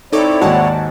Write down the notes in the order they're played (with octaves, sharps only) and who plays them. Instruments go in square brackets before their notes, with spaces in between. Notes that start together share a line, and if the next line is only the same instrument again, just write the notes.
[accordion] C4 E4 C#5 [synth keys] D#4 A4 D6 [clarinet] D5
[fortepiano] D#2 G#2 [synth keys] F#4 F#5 A5